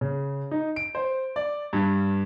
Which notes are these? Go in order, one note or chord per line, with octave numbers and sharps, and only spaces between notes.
C#3
D#4
D7
C5
D5
G2